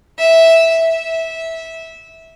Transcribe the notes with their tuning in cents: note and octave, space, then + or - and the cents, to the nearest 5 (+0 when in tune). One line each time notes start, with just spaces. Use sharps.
E5 -5
E5 -15